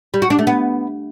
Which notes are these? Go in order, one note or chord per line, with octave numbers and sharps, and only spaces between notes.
G3
F#4
D4
A3
B3